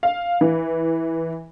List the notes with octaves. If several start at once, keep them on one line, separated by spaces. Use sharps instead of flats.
F5
E3